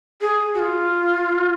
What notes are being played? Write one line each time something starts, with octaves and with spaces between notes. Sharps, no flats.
G#4
F#4
F4